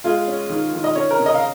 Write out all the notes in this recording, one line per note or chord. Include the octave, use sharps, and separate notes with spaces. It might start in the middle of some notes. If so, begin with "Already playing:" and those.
G#3 F4
C#4
D#3
D#3
D#5
C#4 C#5
A#4
C#3
D#5
F5